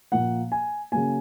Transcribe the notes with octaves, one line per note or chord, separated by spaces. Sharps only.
A#2 F3 A#3 F#5
G#5
C#3 F#3 A#3 G#5